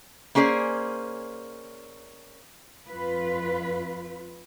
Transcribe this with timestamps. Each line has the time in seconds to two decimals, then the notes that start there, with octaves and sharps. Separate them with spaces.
0.35 A#3 C#4 G#4 C5 D5
2.88 F2 F4 B4